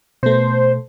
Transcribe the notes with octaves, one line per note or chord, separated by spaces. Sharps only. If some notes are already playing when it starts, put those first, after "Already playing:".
B2 A3 C5